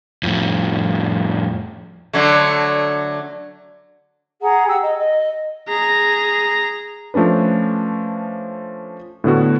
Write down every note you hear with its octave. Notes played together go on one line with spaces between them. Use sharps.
F2 A2
D3 F#3 A3
G#4 F#5 A#5
G4 F#5 E6
D#5
D#5
G#4 A#5
F3 A3 C#4 D4 B4
A2 D3 B3 F#4